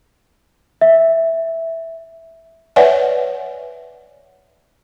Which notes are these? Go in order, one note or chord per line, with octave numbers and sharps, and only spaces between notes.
E5
B4 C#5 D5 E5 F#5 G#5